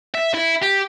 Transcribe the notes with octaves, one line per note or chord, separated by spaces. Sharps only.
E5
E4
G4